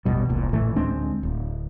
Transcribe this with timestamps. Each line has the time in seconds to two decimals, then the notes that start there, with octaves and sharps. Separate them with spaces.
0.05 A1 E2 B2 G3
0.29 E1 C2 A#2
0.53 A1 A2 E3 A3
0.76 D2 G#3 C4 D4
1.23 D1